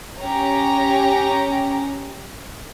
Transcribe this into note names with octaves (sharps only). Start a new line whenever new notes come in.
C#4 G4 C#5 A#5